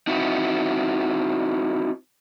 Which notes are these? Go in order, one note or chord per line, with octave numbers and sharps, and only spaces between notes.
C4 D#4 E4 F#4